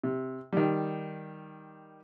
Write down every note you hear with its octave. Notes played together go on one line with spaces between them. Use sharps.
C3
D#3 G3